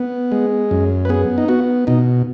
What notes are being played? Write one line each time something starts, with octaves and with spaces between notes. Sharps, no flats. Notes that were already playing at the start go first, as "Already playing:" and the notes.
Already playing: B3
G#3
F#2
B4
B3 G#4
D#4
B3 F#4
B2 D#4